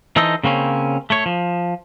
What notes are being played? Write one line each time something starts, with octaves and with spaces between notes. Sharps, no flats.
E3 D#4 A4 C5 D#5
C#3 A#3 C4 C#4
A3 C#5
F3